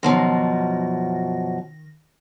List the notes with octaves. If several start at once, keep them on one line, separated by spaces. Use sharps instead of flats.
F#2 B2 D#3 F3 A#6